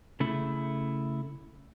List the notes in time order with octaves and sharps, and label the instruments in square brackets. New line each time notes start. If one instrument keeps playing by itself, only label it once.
[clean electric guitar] C#3 A3 E4